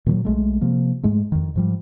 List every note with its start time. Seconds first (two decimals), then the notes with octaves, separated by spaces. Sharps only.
0.06 A#2 D#3 F3 F#3
0.25 B1 G#3 A3
0.61 C3 F3 A#3
1.03 G#2 G#3 A3
1.32 F2 D#3
1.56 G#2 F3 G3